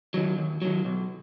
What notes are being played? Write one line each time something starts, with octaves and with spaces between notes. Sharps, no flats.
D#3 F#3
D#2
D#3 F#3
B1